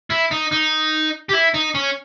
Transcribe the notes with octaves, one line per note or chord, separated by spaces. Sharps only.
E4
D#4
D#4
G4
E4
D#4
C#4